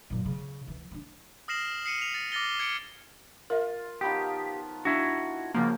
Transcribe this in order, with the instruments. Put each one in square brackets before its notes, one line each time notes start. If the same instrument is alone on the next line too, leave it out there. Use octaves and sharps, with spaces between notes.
[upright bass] F#2 A#2
C#3
D2 E3
B3 D4
[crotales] D#6 F6 A#6 C7 E7 F#7
D#6 C7 C#7 D#7
B6 F7
A6
D6 F6 A6 A#6 G7
G#6 C#7 D7
[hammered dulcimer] F4 [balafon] A#4 E5
[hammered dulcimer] D#3 F3 B3 [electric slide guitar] G4 [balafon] G5 B5
[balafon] D4 [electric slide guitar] E4 F#4
[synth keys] C#3 F3 A#3 [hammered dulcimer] F#4 C5